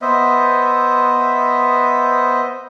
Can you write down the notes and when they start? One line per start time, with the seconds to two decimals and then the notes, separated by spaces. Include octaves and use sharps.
0.02 B3 C5 D#5 E5